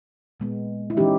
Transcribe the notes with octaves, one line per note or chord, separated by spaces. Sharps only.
A#2 G#3 B3
E4
E3 G#3 C#4 D#4 G4